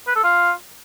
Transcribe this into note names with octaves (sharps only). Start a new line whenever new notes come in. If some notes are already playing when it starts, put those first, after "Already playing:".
B4
A4
F4